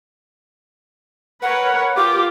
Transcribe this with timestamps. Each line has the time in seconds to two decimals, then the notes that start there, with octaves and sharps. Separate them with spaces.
1.42 A#4 B4 C#5 F#5
1.96 F4 G4 D6